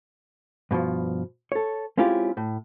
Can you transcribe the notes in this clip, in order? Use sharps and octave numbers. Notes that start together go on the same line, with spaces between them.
G2 B2 D#3 F3
A4 C#5
G#3 C4 C#4 E4 F4 G4
A2